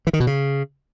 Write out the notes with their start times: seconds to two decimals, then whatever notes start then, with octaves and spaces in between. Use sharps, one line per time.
0.07 E3
0.13 D#3
0.20 B2
0.27 C#3